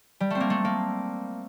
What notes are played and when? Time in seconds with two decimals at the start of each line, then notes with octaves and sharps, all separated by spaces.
0.20 G3
0.30 A3 C4
0.40 A#3
0.50 A3
0.65 A#3